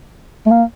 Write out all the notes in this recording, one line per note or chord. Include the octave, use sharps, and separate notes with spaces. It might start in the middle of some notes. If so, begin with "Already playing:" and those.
A3
A#3